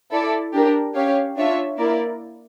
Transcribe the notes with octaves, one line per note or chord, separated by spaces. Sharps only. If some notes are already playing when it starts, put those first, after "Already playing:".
E4 A4 D5
D4 G4 A#4
C#4 G4 C#5 F5
D4 F4 C#5 E5
A#3 E4 A#4 D5